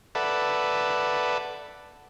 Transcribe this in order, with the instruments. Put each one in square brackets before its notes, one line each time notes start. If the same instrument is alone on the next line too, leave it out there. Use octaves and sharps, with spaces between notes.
[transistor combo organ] A4 B4 D5 E5 F#5